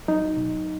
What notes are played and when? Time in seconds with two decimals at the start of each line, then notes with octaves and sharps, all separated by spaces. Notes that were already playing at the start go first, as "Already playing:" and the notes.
0.08 F#3 D#4
0.37 B2